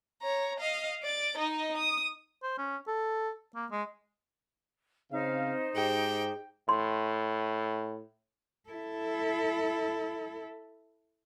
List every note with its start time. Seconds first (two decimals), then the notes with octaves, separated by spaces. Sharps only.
0.22 C#5 A#5
0.60 D#5 F5
1.03 D5 A6
1.37 D#4 D#5
1.77 D#6
2.43 C5
2.58 C#4
2.88 A4
3.55 A#3
3.71 G#3
5.12 C#3 C4 D#4 C5 F5
5.76 G#2 G4 G#4 G5
6.69 A2 C6
8.69 E4 A4